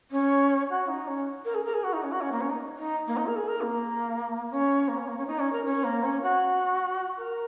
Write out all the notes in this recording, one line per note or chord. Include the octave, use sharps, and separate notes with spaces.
C#4
F#4
D#4
C#4
A#4
G#4
A#4
G#4
F#4
D#4
C#4
F#4
C#4
A#3
C#4
D#4
D#4
A#3
D#4
A#4
G#4
A#4
A#3
C#4
A#3
C#4
A#3
C#4
D#4
C#4
A#4
C#4
A#3
C#4
F#4
A#4